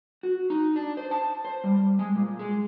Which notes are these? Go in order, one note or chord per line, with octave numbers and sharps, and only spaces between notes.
F#4
D#4
D4
C5
A5
C5
G3
G#3
A#2
G#3